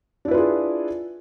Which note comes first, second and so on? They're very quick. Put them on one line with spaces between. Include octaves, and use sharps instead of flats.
D4 E4 B4 F4 G#4